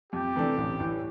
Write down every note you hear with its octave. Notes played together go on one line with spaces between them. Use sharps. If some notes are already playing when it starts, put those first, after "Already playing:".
F2 G4
C3 E3 A3 D4
A1
A2 E3